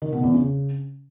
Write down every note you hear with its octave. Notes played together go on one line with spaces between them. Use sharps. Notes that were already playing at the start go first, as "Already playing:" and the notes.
D#3
B2
E2
C#3